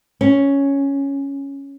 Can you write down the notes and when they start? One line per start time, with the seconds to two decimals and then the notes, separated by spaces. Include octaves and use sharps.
0.21 C#4